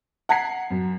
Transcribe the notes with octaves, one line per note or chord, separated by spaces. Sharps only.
F#5 A#5 G#6 B6 C7
F#2